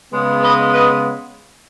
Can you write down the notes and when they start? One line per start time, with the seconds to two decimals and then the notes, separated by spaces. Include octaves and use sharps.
0.12 C#3 G#3 B3
0.43 B4 D#5
0.72 B4 D#5